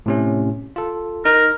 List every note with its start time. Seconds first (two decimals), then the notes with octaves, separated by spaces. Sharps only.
0.06 A2 C3 C#4
0.76 F4 A4
1.25 D#4 A#4